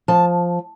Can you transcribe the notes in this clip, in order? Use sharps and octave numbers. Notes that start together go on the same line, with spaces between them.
F3 A5